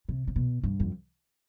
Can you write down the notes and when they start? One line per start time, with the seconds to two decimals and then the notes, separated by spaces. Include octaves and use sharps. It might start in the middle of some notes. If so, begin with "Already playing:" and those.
0.09 C3
0.27 C3
0.36 B2
0.63 G2
0.80 F2